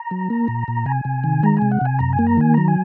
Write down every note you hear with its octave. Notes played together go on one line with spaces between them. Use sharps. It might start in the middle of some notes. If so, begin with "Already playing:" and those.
Already playing: A#5
F#3
A#3
A#2
A#2
C3 G#5
C3
D#3
G#3 A#5
C3 G#5
F#5
C3 G#5
F#2 A#5
G#5
A#3
A#5
D#3 G#5
F#3 A#5
G#5